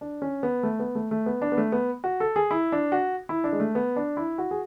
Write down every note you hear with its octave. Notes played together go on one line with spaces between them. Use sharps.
D4
C#4
B3
A3
B3
A3
A3
B3
D4
B3
A3
B3
F#4
A4
G#4
E4
D4
F#4
E4
D4
G#3
A3
B3
D4
E4
F#4
G#4